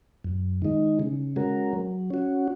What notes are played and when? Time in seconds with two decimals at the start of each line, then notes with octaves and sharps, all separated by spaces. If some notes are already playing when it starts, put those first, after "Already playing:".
0.24 F#2
0.62 D#3 G#3 D#4
1.00 C#3
1.36 G#3 C#4 F#4 A#4
1.73 F#3
2.10 C#4 F#4